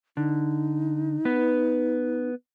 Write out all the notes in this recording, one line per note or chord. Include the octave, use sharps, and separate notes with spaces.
D3 D#4
B3 B4